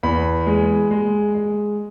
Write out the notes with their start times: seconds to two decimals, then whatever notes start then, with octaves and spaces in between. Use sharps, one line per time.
0.03 E2 B5
0.47 G#3
0.91 G#3
1.35 G#3